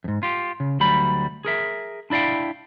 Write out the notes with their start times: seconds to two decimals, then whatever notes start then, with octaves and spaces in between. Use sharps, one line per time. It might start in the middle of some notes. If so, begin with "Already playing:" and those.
0.04 F2 G#2
0.23 F4 G4
0.60 C#3
0.80 D2 F#3 G3 B5
1.45 G#4 A#4 E5
2.10 D4 E4 D5 F5 G5